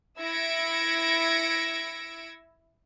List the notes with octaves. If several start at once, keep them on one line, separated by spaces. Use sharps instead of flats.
E4 E6 G#6 A#6 C#7 D7